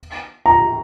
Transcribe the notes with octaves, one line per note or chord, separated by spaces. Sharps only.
A#5